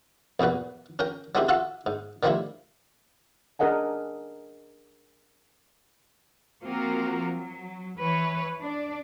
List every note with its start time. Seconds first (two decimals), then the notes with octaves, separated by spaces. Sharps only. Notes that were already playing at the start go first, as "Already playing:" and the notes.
0.40 B1 E2 A#2 F#4 B4
0.99 C#4 A#4 G5
1.35 F#3 G#3 C4 C#4 E4 G4
1.49 F4 F#4 A4 E5 F#5
1.86 G#2
2.23 D3 D#3 F3 G3 A3 E4
3.59 D4 G#4 A#4 D#5 F#5 G#5
6.63 F3 A#3 C4 F4 F#4 A#4
7.33 F#3
7.99 E3 B4 C#5
8.60 D4 D5